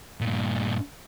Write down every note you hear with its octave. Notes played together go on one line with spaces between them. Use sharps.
G2 A#2